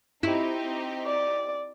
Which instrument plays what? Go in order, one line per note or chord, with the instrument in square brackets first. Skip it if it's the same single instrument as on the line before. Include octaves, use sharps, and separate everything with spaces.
[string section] C4 D#4 G4 [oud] E4
[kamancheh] D5